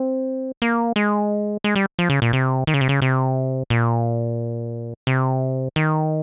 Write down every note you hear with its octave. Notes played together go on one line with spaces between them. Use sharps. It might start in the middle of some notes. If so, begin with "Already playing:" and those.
Already playing: C4
A#3
G#3
G#3
G3
F3
C#3
A#2
C3
D#3
C#3
C3
C#3
C3
A#2
C3
D#3